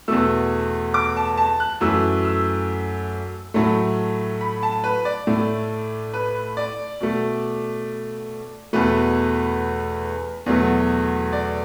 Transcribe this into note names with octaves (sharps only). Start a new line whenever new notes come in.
E2 B2 A3 E6
D6
A5
A5
F#6
F#2 E3 A3 E6
E6
A2 F#3 A3
B5
A5
B4
D5
A2 A3
B4
D5
B2 A3
E2 B2 A3 B4
E2 B2 F#3 A3
D5